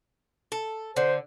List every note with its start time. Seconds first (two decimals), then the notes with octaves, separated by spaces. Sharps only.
0.52 A4
0.96 D3 C5